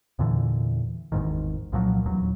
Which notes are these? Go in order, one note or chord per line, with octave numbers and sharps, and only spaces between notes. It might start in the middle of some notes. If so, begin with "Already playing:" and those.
E2 A#2 D3 E3
G#1 E2 G#2 D#3
C2 A#2 F3 F#3
D#1 E2 F#3